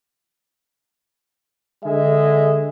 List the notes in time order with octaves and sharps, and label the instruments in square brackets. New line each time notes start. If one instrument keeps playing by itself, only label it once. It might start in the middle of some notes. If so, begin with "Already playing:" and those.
[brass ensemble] D3 G#3 G#4 D#5 E5